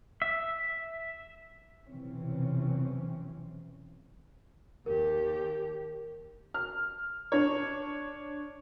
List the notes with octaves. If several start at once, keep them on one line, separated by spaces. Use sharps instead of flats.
E5
F1 B1 C3 E3 C4 C#4
D#2 G4 A#4
F6
D4 C#5